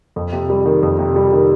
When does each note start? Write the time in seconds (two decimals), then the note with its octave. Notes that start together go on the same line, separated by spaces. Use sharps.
0.16 F2
0.32 C3
0.50 G3
0.66 D#3
0.83 F2
0.99 C3
1.16 G3
1.33 D#3